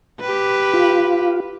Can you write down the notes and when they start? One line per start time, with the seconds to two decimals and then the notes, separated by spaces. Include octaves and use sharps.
0.21 G4 B4
0.74 F4